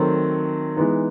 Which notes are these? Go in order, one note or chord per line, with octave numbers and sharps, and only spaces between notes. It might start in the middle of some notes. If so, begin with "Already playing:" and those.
Already playing: D#3 F#3 A3 C4
E3 G#3 B3 D#4